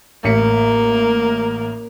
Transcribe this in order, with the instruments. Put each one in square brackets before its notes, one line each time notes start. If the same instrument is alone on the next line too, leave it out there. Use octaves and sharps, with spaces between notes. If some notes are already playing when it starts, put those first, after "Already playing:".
[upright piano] A1 B6 C#7 [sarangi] A#3